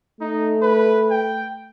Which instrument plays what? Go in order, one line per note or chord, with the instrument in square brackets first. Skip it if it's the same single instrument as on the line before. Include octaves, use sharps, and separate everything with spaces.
[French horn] A3 [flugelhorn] D#4
[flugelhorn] B4
G5